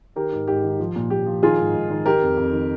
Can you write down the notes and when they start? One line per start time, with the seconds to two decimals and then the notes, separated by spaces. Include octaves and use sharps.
0.16 D#3 G4 A#4
0.32 G#2
0.48 G#2 G4
0.64 D#3
0.80 F3
0.96 A#2
1.10 A#2 G4
1.26 F3
1.42 D#3 F4 G#4
1.58 G#2
1.74 G#2
1.90 D#3
2.05 D#3 G4 A#4
2.22 F2
2.37 F2
2.52 D#3